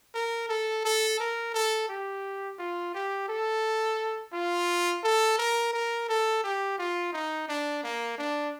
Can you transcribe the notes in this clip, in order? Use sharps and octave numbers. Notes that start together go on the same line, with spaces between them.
A#4
A4
A4
A#4
A4
G4
F4
G4
A4
F4
A4
A#4
A#4
A4
G4
F4
D#4
D4
A#3
D4